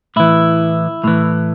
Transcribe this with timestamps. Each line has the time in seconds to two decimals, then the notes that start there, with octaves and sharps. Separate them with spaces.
0.16 A2 E3 E4
1.04 A2 E3